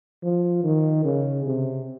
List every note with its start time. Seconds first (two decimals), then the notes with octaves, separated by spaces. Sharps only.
0.23 F3
0.64 D#3
1.05 C#3
1.46 C3